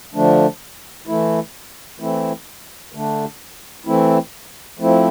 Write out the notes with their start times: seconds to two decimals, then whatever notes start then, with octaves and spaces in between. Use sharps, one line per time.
0.14 D3 F3 A3 D4
1.07 E3 A3 E4
2.00 E3 A3 C4 E4
2.93 D3 A3 D4
3.86 E3 A3 C4 E4
4.79 F3 A3 C4 E4